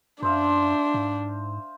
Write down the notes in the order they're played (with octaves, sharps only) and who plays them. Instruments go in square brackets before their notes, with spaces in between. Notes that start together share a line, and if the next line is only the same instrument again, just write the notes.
[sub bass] F#2 [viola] D4 [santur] C5 E5 F5
[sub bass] G#2